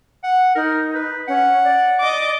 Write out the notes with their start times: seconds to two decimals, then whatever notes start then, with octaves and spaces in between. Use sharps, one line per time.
0.24 F#5
0.55 D#4 A#4
0.95 B4
1.28 C#4 F#5
1.64 D5
2.00 D#5 D6